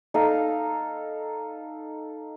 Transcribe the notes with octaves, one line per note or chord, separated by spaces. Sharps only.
D#4 A4 F5